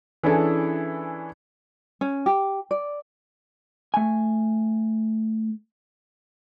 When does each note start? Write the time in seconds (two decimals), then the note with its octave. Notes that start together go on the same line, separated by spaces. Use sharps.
0.23 E3 C#4 D4 E4 G#4 A4
2.01 C#4
2.26 G4
2.71 D5
3.94 A3 G#5